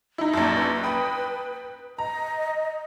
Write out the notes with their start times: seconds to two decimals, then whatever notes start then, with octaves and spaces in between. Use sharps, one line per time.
0.18 D#4 E4
0.33 A#1 F#2 A5
0.56 B4
0.83 G5 B5 D#6
1.98 D#5 A#5